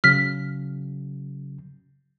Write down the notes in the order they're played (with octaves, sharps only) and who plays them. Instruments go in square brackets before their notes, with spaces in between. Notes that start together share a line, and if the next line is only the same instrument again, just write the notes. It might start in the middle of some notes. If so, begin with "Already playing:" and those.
[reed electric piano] C#3 F#3 [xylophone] F6 B6